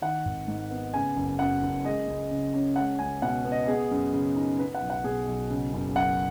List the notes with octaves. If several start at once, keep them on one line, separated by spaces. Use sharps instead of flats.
D#3 F#5
G#1
G#2
B3
C#3 G#5
F#1
F#2 F#5
F#1
G#3 D#5
C#2
C#3
C#4
G#3 F#5
C#2 G#5
B2 F#5
B3
D#5
B3 G#4
F#2
C#3
D#4
B3 B4
F#5
B1
F#5
B2 G#4
B1
C#3
F#1
F#2 F#5